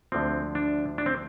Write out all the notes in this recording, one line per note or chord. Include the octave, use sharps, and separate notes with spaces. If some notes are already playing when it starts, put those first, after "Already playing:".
D2 D3 F3 C4
D4
D4
C4